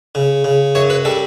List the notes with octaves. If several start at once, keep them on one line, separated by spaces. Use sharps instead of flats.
C#3
C#3
F#2 C#5
B4
G3 A4